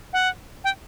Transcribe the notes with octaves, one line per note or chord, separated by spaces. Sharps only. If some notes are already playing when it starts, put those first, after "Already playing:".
F#5
G5